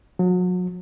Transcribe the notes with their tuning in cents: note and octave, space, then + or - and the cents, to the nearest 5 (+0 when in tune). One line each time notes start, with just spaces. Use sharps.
F#3 -35